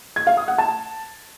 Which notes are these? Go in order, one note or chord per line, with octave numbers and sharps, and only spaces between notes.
G#6
F5
D#6
F#5
A5